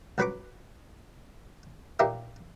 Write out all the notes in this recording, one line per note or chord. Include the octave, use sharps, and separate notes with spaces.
C#2 F#3 B4 B5 C#6 D6
A#2 A#3 D#4 G4 E5